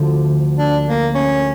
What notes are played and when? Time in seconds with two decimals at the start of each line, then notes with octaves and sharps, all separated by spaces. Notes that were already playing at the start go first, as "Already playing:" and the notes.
Already playing: D2 D3 F3
0.58 D4
0.87 A#3
1.15 C#4